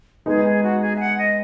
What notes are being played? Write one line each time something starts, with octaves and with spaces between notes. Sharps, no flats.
G#3 B3 D#4 G#4
G#4
F#4
G#4
E5
F#5
D#5